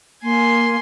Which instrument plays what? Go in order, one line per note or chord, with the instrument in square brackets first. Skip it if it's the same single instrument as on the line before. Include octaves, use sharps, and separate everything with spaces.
[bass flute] A#3 [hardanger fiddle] G#5 C6